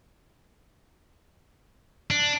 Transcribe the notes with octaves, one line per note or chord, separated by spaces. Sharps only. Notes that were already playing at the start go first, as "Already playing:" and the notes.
D4